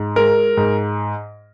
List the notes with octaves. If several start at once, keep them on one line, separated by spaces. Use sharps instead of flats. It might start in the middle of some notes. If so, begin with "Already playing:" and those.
Already playing: G#2
G#3 A#4
G#2